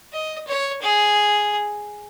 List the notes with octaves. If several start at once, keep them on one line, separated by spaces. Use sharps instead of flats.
D#5
C#5
G#4